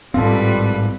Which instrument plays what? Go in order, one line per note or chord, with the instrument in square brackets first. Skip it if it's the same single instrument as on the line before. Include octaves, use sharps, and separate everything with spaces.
[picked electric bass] A1 G#2 C4 [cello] G3 B4 [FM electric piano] F4 A4